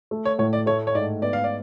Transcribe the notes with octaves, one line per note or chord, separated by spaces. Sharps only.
A3
C#5
A2 C#5
D5
A3 C#5
C#5
G#2 D5
B3 D5
F5
D5